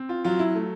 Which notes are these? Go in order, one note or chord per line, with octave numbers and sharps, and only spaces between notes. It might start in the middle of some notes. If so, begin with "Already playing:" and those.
Already playing: C4
F4
F#3 F4
E4
A3